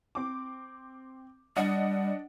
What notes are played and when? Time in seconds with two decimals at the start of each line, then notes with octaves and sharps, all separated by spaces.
0.15 C4 D6
1.57 G3 D4 D#5 F#5